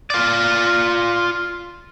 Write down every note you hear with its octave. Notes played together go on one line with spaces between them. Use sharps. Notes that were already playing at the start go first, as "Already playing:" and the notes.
F4 D5